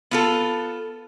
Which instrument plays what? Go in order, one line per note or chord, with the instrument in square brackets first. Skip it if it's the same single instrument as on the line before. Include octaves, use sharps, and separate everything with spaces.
[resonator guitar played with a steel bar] B3 F4 A4